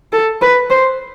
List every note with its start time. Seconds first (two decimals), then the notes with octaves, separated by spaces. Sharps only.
0.13 A4
0.42 B4
0.70 C5